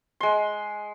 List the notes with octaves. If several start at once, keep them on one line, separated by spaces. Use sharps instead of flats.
G#3 C6